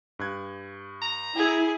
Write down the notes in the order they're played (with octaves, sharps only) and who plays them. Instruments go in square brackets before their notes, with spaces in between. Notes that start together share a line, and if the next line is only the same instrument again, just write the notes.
[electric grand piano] G2 F#6 G#6
[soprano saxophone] A#5
[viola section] E4 [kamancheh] G#4